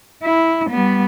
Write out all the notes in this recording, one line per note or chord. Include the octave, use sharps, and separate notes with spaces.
E4
G3 B3